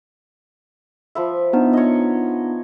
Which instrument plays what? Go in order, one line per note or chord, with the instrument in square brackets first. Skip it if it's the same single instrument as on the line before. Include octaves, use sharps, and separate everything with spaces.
[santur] F3 B4 E5
[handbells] B3 D4 D#4
[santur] C#5 D#5